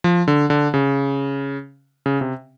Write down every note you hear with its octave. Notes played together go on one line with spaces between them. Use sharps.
F3
D3
D3
C#3
C#3
C3